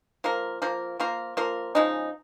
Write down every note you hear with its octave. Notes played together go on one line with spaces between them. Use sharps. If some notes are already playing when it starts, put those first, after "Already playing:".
F3 A#3 F4 A#4
F3 A#3 F4 A#4
F3 A#3 F4 A#4
F3 A#3 F4 A#4
C#3 F3 G#3 D#4